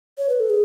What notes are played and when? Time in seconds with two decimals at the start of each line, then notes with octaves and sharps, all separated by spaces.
0.18 C#5
0.29 B4
0.40 A4
0.50 G#4